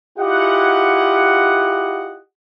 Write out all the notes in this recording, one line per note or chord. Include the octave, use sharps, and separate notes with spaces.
E4 F4 G4 G#4 D#5 F#5